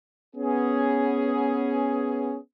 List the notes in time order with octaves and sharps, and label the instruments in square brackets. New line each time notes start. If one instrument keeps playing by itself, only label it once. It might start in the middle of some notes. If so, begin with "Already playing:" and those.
[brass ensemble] B3 C#4 G#4